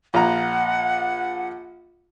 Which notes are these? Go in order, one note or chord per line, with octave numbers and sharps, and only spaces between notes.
A#1 F4 F#5 A#5